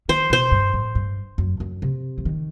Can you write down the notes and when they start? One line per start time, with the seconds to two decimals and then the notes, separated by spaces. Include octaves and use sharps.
0.09 D#3 C5
0.30 B2 C5
0.51 G2
0.74 A2
0.95 G2
1.38 F#2
1.60 F#2
1.82 C3
2.18 E3
2.25 D#3